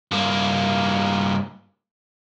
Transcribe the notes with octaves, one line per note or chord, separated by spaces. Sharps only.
G2 A#3